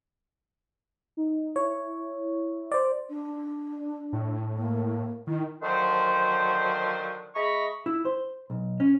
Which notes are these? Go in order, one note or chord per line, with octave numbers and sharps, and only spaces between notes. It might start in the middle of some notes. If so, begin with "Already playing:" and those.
D#4
E4 C#5
C5 D5
D4
A2
A#3
D#3 E4
D3 D#3 F3 F#3 C5
G#3 E4 D#5 A#5 B5 C#6
E4
C5
B1
C#4